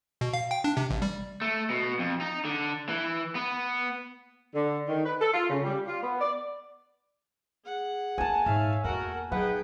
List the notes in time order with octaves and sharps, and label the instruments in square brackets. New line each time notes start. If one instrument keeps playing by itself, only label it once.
[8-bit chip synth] B2
F5
G5
D4
C3
A1
G3
[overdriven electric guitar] A3
B2
F2
D#4
D3
E3
B3
[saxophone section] D3
D#3
B4
A4
F4
C#3
G3
F4
B3
D5
[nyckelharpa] G#4 F#5
[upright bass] A#3 B3 [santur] G#5 A5
[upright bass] G#2 [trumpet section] C#5 E5 [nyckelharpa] F5
[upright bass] E2 A#3 [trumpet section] A3 A#4 [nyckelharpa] F#4 F#5
[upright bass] F#3 [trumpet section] B3 D#4 B4 [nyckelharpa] G#4 G5 [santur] F#5